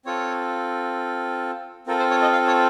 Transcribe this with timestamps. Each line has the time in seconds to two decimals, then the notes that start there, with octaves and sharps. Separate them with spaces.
0.05 C4 F4 A4 C#5
1.87 C4 F4 A4 A#4
1.99 C5
2.11 C#5
2.22 D#5
2.32 F5
2.47 C#5